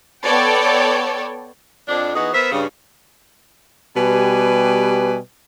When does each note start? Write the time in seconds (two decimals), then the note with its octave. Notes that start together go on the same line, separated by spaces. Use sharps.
0.23 B3 A4 C#5 D5 G5
1.88 F2 D4
2.15 E3 B3 D#4 F#4 G#4
2.33 B3 A#4 C5 E5
2.52 G2 C#3
3.96 B2 G3 G4 B4 G#5